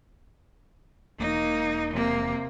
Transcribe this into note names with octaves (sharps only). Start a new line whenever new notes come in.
E1 A#3 D#4
C3 A#3